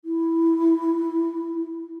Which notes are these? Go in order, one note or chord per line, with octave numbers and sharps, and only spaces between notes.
E4